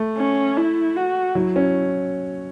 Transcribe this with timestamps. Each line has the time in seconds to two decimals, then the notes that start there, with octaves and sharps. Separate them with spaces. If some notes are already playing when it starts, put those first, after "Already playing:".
Already playing: A3
0.17 C#4
0.57 E4
0.96 F#4
1.35 F#3 E4
1.56 C#4